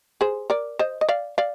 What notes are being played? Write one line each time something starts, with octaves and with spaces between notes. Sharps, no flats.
G#4 C5
A#4 D5
C5 D#5
D#5
D5 F5
D5 F5